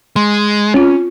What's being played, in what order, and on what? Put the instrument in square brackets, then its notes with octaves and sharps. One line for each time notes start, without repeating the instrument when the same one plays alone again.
[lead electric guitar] G#3 [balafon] C6
[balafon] C4 F4 [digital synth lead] C#4